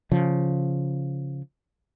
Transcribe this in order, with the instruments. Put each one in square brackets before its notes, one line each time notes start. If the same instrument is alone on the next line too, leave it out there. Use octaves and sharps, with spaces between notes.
[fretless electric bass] C#3 F3